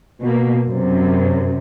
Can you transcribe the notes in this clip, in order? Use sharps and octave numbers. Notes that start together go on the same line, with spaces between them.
B2 A#3
F#2 C3